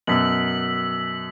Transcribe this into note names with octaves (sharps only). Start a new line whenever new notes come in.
F#2 B2 E6 B6 F#7